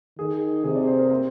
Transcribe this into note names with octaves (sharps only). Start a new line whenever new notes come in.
D#3 G#4
C3 G#4
D5
C5
A#4
C4